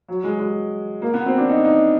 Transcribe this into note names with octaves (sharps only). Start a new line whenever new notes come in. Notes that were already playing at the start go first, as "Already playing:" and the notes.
F#3
G#3
G#3
A#3
B3
C4
D4
D#4
D#4